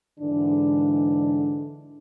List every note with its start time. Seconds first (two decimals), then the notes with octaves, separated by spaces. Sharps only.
0.18 G#2 D3 E3 D4